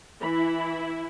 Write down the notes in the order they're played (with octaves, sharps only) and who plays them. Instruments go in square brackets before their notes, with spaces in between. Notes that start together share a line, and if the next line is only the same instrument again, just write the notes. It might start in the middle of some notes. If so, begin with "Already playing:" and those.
[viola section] E3 B5 [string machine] E4